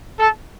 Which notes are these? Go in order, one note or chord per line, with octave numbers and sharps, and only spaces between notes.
A4